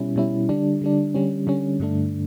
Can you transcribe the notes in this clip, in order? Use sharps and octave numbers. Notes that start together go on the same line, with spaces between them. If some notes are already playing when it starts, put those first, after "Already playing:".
Already playing: B2 G3 C#4 E4
B2 G3 C#4 E4
D3 G3 D4
D3 G3 D4
D3 G3 C#4
D3 G3 C#4
G2 D3 A3 D4